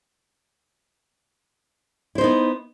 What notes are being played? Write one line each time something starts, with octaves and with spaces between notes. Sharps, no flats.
B3 D#4 E4 C5